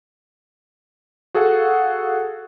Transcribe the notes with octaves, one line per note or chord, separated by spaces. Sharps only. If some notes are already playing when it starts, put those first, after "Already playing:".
F#4 G#4 A4 F5 F#5